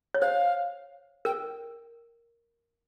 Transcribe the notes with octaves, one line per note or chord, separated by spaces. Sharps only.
C#5
C5 F5
A#4 G5